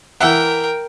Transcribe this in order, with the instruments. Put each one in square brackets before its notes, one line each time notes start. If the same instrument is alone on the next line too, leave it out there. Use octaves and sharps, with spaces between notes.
[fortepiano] E3 E5 F#5 [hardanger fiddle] A#4 G5